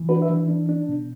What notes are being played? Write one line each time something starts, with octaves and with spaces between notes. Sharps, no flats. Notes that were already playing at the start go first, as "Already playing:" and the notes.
Already playing: E3
D4 F#4 B4
B4 E5
E3
D4
D4
B2